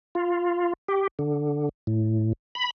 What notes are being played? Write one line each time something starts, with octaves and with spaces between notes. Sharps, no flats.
F4
G4
D3
A2
B5